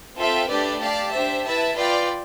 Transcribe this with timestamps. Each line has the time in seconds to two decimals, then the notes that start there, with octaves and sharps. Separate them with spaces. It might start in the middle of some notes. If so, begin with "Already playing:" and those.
0.16 C4 F4 A4 E5 G5
0.48 A3 D4 G4 B4 D5
0.79 G4 D5 F5 A5
1.11 D4 G4 C5 E5
1.44 E4 B4 E5 A5
1.76 F4 B4 D5 G5